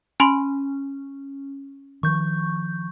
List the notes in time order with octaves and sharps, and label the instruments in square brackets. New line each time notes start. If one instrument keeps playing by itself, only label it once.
[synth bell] C#4 [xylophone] G#5 B5 C6
[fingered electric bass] D#3 F3 [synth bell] C#6 G6